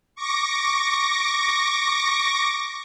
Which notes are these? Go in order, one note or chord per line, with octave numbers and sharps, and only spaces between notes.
C#6 D6 A#6